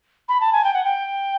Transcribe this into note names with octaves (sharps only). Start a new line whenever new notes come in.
B5
A5
G#5
G5
F#5
G5